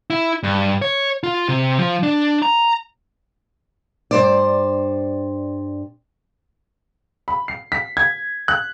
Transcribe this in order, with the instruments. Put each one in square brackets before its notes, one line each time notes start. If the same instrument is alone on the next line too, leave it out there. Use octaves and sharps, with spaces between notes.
[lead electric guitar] E4
G2
C#5
F4
C3
F3
D4
A#5
[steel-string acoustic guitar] G2 C5 D5
[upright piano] B5
C7
B6
G#6
F#6